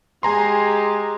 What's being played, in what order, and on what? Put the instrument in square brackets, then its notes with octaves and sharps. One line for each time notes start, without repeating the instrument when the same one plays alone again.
[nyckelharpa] G#3 G4 [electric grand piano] G#5 A#5 C6